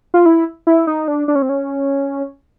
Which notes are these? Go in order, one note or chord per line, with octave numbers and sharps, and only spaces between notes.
F4
E4
E4
D#4
D4
D4
C#4
C4
C#4